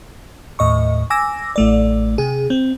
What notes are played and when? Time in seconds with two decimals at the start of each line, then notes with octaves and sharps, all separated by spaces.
0.59 D#2 A2 D#5 C#6
1.10 G#5 D6 E6 A#6
1.56 A1 A3 D5
2.18 C3 G#4
2.50 C4